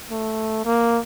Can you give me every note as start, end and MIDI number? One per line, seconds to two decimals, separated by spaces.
0.11 0.64 57
0.65 1.00 58